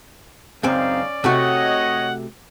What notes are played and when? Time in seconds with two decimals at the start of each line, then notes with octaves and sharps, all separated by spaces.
0.63 C#2 F#2 C4 C#4 D#4 G#4 D5 F5
1.24 C3 A3 F#4 C#5 D#5 F#5